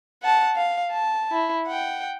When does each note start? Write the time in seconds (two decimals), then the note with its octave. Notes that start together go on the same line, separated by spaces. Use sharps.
0.23 F#5 A5
0.56 F5
0.91 A5
1.31 E4
1.66 F#5 G5